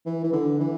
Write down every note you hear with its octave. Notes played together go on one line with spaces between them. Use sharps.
E3
E3
D3
E3